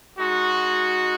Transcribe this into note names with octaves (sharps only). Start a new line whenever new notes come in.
G#3 D#4 F#4